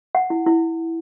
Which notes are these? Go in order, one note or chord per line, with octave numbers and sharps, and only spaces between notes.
F#5
E4
E4